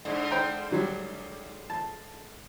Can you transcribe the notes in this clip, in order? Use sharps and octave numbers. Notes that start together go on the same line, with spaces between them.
G#2 D3
C5 G5 A#5
D2 F#3 G3
A5